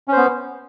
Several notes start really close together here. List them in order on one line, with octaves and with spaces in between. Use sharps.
C#4 C5 B3